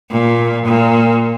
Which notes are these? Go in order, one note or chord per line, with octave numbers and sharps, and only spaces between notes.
A#2
A#2